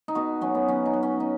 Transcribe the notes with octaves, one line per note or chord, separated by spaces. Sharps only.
D#4
B2 F#4
F#3 C#4
B3
F#3 C#4
D#4
F#3
C#4
D#4